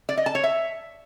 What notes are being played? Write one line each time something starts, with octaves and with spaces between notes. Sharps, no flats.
D5
D#5
A5
C#5
E5